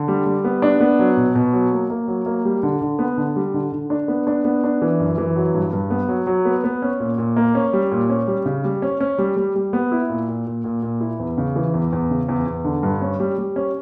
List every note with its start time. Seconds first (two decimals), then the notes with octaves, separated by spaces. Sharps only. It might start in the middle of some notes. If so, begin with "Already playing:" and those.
Already playing: D3
0.08 G3
0.26 G3
0.44 B3
0.62 D4
0.81 B3
0.99 F#3
1.17 B2
1.35 B2
1.53 F#3
1.72 A#3
1.90 A#3
2.08 F#3
2.26 A#3
2.45 G3
2.63 D3
2.81 D3
2.99 B3
3.18 D3
3.36 G3
3.54 D3
3.72 D3
3.90 D4
4.08 B3
4.27 D4
4.45 B3
4.64 D4
4.82 E3
5.00 F#2
5.18 E3
5.36 F#3
5.54 G2
5.73 G2
5.90 B3
6.09 F#3
6.27 F#3
6.45 B3
6.64 B3
6.82 C#4
7.00 A#2
7.18 A#2
7.36 A#3
7.55 C#4
7.73 G3
7.92 A#2
8.10 C#4
8.28 G3
8.46 C#3
8.64 G3
8.82 C#4
9.00 C#4
9.18 G3
9.37 G3
9.56 G3
9.73 B3
9.92 E4
10.09 A#2
10.29 A#2
10.46 A#2
10.64 A#2
10.82 A#2
11.01 E4
11.19 E2
11.38 C#3
11.56 E3
11.74 E2
11.93 E2
12.10 C#3
12.29 E2
12.47 E2
12.65 D3
12.83 G2
13.02 C#4
13.20 G3
13.38 G3
13.56 C#4